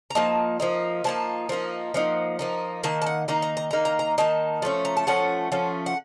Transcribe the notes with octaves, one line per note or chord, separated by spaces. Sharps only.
A#5
F3 A#3 D#4 A5
F3 A#3 D#4
F3 A#3 D#4 A5
F3 A#3 D#4
F3 A#3 D#4 F#5
F3 A#3 D#4
D#3 A#3 D#4 A5
A5
F#5
D#3 A#3 D#4 A#5
A#5
A#5
D#3 A#3 D#4 A#5
A#5
A#5
D#3 A#3 D#4 A5
F3 A3 C#4
A#5
A5
F3 A3 C#4 F#5
F3 A3 C#4
F#5